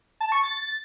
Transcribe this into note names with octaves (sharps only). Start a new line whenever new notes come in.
A5
C#6
A6